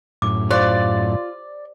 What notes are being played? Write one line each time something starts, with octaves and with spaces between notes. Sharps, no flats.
F#2 A2 D6
F4 G4 C5 D5